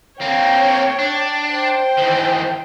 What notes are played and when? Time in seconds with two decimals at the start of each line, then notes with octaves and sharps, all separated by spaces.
0.21 A#3 C4 C#5 G5
0.99 D4
1.48 C5 G5
1.97 E2 D#3